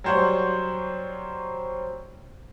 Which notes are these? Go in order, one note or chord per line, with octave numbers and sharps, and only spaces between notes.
F#3 G3 C5 C#5 F#5